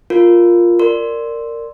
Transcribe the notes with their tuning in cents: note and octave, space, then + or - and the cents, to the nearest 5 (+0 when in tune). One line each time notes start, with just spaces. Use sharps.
F4 +0 A#4 +0
A#4 -15 D5 +0 C6 +0